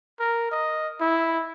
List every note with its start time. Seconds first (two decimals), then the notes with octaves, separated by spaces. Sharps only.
0.20 A#4
0.51 D#5
1.01 E4